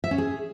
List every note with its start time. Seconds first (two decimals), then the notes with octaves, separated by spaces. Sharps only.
0.04 E5
0.11 C#4
0.18 G#4